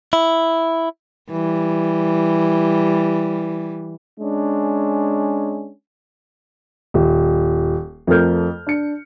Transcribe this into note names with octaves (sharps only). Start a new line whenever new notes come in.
E4
E3 G3
G#3 C#4 D4
D#1
F2 F3 A3 A#4 F6 G6
D4 C#7